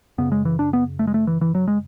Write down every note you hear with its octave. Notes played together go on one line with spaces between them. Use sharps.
F#2 C#3 B3
G#3
E3
D4
B3
A3
G#3
A3
E3
E3
F#3
G#3